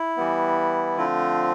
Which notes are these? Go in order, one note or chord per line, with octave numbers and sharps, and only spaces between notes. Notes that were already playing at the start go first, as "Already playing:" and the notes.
Already playing: E4
E3 G3 B3
D3 F3 A3 C4 F4